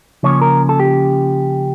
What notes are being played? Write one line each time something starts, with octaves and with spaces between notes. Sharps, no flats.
C#3 F3 A#3 C#4 C#5
A#4
A4
G4